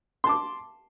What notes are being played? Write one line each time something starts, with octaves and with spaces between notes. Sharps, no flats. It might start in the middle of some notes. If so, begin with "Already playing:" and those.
A5 C6 D6